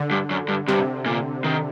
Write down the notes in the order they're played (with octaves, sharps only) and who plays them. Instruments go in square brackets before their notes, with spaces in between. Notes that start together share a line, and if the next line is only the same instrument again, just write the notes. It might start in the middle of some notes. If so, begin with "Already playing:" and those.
Already playing: [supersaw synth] D3
[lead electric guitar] G2
F#2
G2
[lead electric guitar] G2 [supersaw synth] C3
[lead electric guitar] A#2
D#3